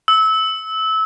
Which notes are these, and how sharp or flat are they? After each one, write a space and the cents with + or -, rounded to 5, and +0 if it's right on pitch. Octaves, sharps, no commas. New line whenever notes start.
E6 -20